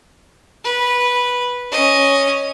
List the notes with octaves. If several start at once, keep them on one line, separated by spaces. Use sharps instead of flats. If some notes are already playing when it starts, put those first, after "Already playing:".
B4
C#4 D#5